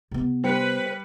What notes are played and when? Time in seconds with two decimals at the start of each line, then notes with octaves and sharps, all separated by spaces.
0.11 C3 B3
0.44 G3 B4 C5 G5 C#7